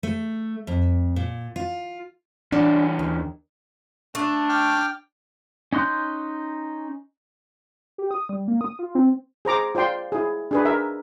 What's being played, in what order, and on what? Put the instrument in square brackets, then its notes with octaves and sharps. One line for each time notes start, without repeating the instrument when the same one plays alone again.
[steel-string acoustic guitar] A3
F2
A#2
F4
[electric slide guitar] E2 C#4 [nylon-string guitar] D4
[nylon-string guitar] D#2
[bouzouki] A3 [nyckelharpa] D4
[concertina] G5 D6 F6
[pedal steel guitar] C#4 D#4 C6 F#6 G6
[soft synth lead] G4
D#6
G3
A#3
D#6
F4
C4
[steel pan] G#4 C5 A#5 D6
F4 C5 D5 G5 C6
E4 G#4
D4 G#4 B4
A#4 E5